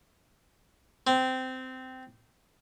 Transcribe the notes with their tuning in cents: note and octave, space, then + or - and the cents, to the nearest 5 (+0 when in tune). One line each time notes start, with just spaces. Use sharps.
C4 -15